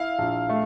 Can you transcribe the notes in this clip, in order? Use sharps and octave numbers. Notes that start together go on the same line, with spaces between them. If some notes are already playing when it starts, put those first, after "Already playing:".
Already playing: E4 F5
A#1
A3